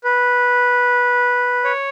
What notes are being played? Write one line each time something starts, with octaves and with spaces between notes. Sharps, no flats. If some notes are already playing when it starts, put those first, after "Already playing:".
B4
C#5